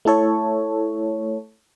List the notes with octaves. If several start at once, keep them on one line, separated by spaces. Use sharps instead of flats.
A3 E4 A4 C#5